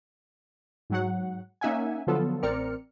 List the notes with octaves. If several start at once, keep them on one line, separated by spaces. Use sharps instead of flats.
G#2 F#3 F#5
A#3 C#4 D#4 E5 F#5 G#5
D3 F3 F#3 B3 F4 A4
A1 C4 A#4 D5 F6 C#7